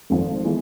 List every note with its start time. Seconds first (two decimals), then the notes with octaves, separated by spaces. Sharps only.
0.10 G#1 G#2 F3 A3
0.45 E3 G#3 B3